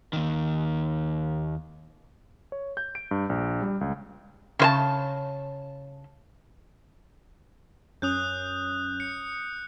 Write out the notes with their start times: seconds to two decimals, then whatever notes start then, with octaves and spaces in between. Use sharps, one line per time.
0.13 D#2 D#3
2.52 C#5
2.77 G6
2.95 D7
3.11 G2
3.30 A#1
3.62 G3
3.81 C#2
4.59 C#3 C5 A5
8.02 F#2 C#4 D#6 F#6 G6
9.00 C#7